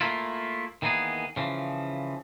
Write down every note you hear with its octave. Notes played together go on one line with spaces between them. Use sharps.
A3 A#3 E4 F4
D#3 E3 A#3 B3 G#4
C#3 E3 F3